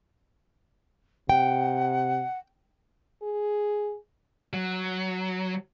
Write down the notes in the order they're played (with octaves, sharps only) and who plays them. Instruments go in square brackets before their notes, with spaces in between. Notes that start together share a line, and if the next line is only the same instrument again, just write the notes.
[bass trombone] C3 [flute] F#5 [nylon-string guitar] G5
[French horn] G#4
[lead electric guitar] F#3